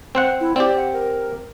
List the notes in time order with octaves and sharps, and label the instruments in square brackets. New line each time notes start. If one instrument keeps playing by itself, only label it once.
[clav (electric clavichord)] C4 C5 F#5
[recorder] E4
[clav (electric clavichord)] C4 G4 [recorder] D5
[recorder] F#5
A#4